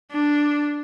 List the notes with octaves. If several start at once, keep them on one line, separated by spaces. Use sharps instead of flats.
D4